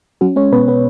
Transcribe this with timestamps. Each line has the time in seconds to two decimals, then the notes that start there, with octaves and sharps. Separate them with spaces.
0.21 F#3 C#4 F#4
0.36 G#3 C#4 C#5
0.52 B2 B3 B4
0.68 B2 B3 B4